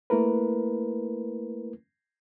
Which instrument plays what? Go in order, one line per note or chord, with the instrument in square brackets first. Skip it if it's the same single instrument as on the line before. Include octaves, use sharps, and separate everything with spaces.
[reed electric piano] A3 A#3 E4 A#4 B4